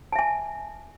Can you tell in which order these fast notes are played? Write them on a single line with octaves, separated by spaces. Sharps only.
A5 E5 G#5